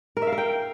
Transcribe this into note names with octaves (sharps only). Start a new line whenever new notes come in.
A#4
E5
F5
A#4
G5